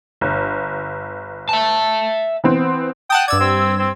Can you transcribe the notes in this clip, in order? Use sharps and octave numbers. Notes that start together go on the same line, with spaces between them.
G1
E5 A5
E3 B3 C4
F#5 G5 A5 D#6
G2 D5 E6 G#6
C4
C4